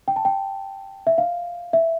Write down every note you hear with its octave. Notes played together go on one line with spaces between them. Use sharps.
G5
A5
G5
E5
F5
E5